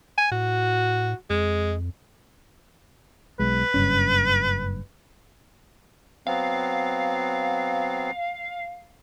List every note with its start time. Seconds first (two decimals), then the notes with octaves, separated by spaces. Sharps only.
0.18 G#5
0.31 A2 F#4
1.30 F2 G#3
3.39 B1 G#3 B4
3.74 F#1 G2 C#4
6.27 F#3 B3 C4 F5